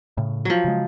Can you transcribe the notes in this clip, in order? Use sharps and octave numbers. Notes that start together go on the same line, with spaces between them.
A2 C#3
F3 F#3
C#3 G#3